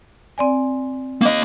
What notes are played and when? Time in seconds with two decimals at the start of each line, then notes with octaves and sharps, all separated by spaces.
0.38 C4 D5 G#5
1.21 A#3 D#5